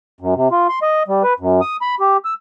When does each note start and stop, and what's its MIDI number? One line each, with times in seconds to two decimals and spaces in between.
0.20 0.34 42
0.36 0.48 48
0.52 0.67 65
0.69 0.79 84
0.82 1.03 75
1.08 1.23 55
1.23 1.33 71
1.40 1.61 42
1.61 1.77 87
1.82 1.95 83
2.00 2.17 67
2.25 2.34 88